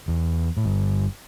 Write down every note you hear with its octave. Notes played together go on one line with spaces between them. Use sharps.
E2
A2
G1 G2